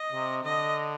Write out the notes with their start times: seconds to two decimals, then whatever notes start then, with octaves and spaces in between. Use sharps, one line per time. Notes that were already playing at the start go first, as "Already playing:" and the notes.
Already playing: D#5
0.12 C3
0.44 D3 D#5